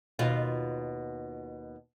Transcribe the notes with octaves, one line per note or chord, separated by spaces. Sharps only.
D#2 B2 F4